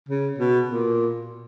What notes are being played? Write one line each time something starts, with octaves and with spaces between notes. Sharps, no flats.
C#3
B2
A#2